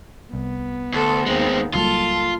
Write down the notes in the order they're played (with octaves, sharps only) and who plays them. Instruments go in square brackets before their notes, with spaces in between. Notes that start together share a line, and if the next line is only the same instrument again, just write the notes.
[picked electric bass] C2 [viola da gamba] B3
[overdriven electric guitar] D2 [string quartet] A4
[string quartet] D#2 [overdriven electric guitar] G#3 C4
[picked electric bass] C#2 F#3 G3 [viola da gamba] A#3 [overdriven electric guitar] F4 [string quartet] A4